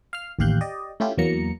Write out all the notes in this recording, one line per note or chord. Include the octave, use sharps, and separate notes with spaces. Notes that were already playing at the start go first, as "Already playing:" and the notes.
F5 F6
A1 D#2 G4 F5 F#6 G6
G4 D5 D#5
A3 C#4 E4 F4 G4
E2 E3 F#3 A#3 A#5 C#7